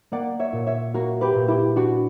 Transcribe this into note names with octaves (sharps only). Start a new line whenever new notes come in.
A#3 D5 F#5
C#5 E5
A#2
C#5 E5
A#3 F#4 A#4
G4 B4
A#2
E4 G4
D4 F#4